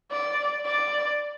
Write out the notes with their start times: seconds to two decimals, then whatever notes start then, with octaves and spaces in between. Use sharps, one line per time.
0.12 D5
0.66 D5